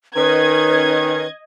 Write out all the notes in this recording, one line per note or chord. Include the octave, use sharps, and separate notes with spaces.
D#3 C#4 B4 D#5 G#6